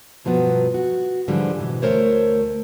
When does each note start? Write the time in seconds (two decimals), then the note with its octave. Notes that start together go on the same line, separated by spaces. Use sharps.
0.24 G2 B2 F3 F#3 B3
0.74 F#4
1.28 G#2 D3 E3 F3 G3
1.60 B2 E3
1.82 D2 A3 D#4 A#4 C5 C#5